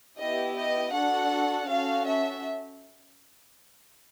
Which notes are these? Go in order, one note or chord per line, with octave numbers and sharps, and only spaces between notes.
B3 E4 G4 D#5
D#5
D4 F#4 A4 F#5
C#4 F#4 A4 F5
E5